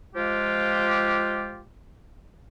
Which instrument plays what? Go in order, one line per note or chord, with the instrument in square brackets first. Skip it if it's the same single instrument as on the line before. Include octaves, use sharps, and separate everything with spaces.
[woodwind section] F3 G#3 F4 G4